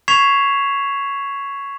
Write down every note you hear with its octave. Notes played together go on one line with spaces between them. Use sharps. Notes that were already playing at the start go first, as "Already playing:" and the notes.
C#6 G#6 B6 C7 E7 F7